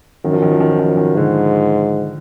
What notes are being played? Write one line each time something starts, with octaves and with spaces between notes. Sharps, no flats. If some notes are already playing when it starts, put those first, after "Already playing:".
F#2 D#3
F3
D#3
F3
D#3
F3
D#3
F3
D#3
G#2 D3